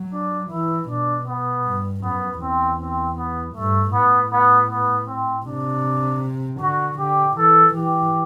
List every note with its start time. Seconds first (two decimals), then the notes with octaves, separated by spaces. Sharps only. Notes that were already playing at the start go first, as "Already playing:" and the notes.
Already playing: F#3
0.13 D4
0.51 E3 E4
0.89 B2 D4
1.28 B3
1.65 G2
2.03 F#2 B3
2.41 E2 C4
2.79 C4
3.18 B3
3.55 G2 A3
3.93 A2 B3
4.33 B3
4.70 B3
5.08 C4
5.46 C3 D4
6.61 D3 F#4
6.99 D3 G4
7.37 E3 A4
7.74 E3 G4